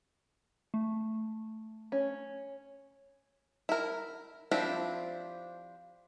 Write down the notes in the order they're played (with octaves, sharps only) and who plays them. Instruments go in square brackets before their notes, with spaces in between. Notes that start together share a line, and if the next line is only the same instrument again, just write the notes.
[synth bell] A3
[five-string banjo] C#4
E4 A#4
F3 C4 D4 E4 G4